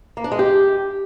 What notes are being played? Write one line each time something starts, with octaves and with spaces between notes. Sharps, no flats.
A#3
D4
G#3
G4